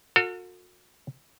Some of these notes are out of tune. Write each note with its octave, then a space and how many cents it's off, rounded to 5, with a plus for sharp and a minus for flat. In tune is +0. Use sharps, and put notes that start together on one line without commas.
F#4 -40 A4 +45